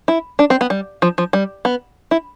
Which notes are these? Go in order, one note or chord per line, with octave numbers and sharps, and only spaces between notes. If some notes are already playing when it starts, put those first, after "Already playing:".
E4
D4
C4
B3
G3
F3
F3
G3
B3
E4